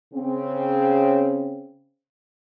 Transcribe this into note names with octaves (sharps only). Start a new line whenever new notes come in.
C#3 C4